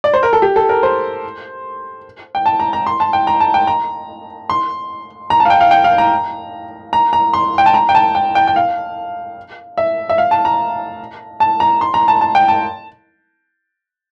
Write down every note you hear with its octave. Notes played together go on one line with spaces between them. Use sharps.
D5
C5
A#4
A4
G4
A4
A#4
C5
G5
A5
A#5
A#5
C6
A5
G5
A#5
A5
G5
A#5
C6
A#5
A5
F5
G5
F5
G5
F5
A#5
A#5
A#5
C6
G5
A5
A#5
G5
A5
G5
G5
G5
F5
E5
E5
F5
A5
A#5
A5
A#5
C6
A#5
A5
A5
G5
A5